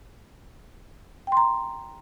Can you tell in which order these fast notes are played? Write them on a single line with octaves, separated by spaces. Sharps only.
G5 C6 A#5